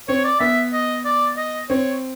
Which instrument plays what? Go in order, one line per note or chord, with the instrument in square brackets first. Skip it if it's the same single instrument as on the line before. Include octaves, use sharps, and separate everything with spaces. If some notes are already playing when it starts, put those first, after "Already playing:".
[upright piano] C4 [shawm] C#5
[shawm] D5
[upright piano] B3 [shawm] E5
[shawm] D#5
D5
D#5
[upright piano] C4 [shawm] C#5